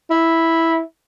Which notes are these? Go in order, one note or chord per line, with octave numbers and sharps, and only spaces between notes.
E4